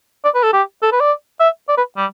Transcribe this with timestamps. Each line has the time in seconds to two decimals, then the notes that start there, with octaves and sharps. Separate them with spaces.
0.25 D5
0.35 B4
0.43 A4
0.53 G4
0.83 A4
0.92 B4
1.01 D5
1.40 E5
1.69 D5
1.78 B4
1.97 G3